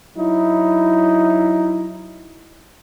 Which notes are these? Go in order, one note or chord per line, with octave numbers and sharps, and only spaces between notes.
F#3 D#4 E4